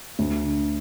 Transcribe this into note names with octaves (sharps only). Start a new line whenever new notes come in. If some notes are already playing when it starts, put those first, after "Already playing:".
D2
D3